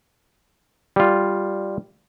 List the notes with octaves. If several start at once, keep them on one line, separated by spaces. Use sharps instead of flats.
G3 F4